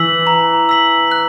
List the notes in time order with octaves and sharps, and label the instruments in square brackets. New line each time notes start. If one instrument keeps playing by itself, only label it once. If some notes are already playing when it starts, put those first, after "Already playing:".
Already playing: [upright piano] E3 [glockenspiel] E6 B6 F#7
[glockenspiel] A#5
E6 B6 F#7
F#6